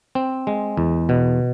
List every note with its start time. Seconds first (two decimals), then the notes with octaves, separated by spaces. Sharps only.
0.15 C4
0.47 G#3
0.77 E2
1.09 B2